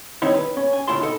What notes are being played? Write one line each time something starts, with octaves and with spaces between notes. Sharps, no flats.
D#3 G3 C4 C#4 D#4 E4
B4
C#4
G#5
D2 A2 E4 F4 A5 C6
D#4 A4